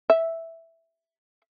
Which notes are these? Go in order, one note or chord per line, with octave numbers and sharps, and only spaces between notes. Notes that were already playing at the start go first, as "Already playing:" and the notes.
E5